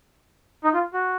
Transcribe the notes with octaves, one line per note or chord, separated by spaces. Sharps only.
D#4
F4
F#4